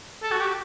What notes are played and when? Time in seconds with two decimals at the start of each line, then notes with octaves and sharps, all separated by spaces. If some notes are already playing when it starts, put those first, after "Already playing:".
0.23 A4
0.31 F#4
0.40 G4